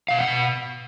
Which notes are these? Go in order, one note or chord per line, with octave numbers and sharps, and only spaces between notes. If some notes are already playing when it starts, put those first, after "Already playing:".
B2 F5
F#5
B2